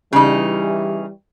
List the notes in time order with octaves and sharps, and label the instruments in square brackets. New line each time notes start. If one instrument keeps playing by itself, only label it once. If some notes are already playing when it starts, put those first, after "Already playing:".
[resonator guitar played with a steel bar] C#3 D#4 [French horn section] E3 G3